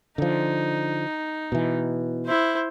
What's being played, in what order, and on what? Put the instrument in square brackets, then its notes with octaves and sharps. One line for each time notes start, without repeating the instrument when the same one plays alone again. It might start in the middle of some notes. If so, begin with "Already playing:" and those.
[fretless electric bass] D3 F3 [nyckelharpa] D#4
[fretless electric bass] B2 E3
[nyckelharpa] E4 C5